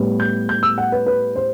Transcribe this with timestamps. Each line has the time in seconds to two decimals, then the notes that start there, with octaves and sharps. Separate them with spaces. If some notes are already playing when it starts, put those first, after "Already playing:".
Already playing: A2 G3 B3
0.20 G6
0.49 G6
0.63 E6
0.78 F#5
0.92 B4
1.06 B4
1.36 C5